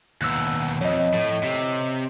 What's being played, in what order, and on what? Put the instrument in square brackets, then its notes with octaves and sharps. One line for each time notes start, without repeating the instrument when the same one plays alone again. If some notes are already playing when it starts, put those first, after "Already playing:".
[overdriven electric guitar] D#2 B2 [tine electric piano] E6 F#6
[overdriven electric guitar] F2 [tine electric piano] C#5 D#5
[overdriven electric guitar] A2
C3